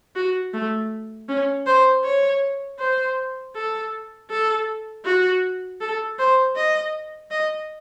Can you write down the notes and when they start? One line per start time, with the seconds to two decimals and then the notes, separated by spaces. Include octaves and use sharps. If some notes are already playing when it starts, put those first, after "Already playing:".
0.15 F#4
0.53 A3
1.28 C#4
1.66 C5
2.04 C#5
2.79 C5
3.55 A4
4.30 A4
5.05 F#4
5.81 A4
6.19 C5
6.55 D#5
7.31 D#5